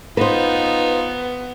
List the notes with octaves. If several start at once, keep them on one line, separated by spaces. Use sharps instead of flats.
B3 D#4 F4 B4 C5